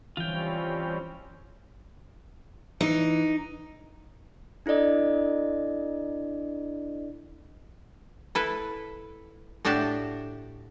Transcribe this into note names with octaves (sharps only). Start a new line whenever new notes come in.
E3 G3 C4 C#4 F4 G5
E3 D#4
D4 E4 A4 D5 D#5
E4 A4 B4
A2 D4 F#4 G4 D5 A5